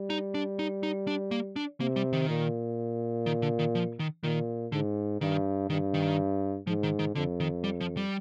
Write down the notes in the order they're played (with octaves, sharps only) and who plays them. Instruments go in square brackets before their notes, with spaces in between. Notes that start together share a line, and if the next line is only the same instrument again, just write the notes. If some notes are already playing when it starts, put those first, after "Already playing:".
Already playing: [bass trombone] G3
[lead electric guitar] D#4
D4
D#4
D#4
D4
A#3
D4
[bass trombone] C3 [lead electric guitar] A#3
[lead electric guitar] G3
D#3
[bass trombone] A#2
[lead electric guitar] D#3
D3
D#3
F3
D#3
[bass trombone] A#2 [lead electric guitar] D#3
[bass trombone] G#2 [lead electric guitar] D3
[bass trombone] G2 [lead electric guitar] D#3
[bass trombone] G2 [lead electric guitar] D#3
[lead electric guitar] D#3
[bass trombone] G#2 [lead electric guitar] F3
[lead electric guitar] D#3
D#3
[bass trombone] F2 [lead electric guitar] D3
[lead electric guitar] D#3
G3
F3
G3